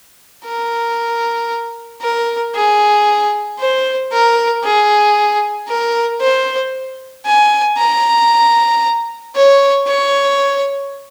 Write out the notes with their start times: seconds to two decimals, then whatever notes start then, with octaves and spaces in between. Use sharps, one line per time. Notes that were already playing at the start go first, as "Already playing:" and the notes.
0.45 A#4
2.02 A#4
2.55 G#4
3.59 C5
4.12 A#4
4.64 G#4
5.68 A#4
6.21 C5
7.26 G#5
7.78 A#5
9.35 C#5
9.87 C#5